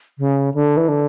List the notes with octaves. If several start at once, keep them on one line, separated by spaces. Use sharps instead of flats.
C#3
D3
E3
D3